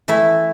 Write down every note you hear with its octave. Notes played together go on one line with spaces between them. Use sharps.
E3 A3 E4 E5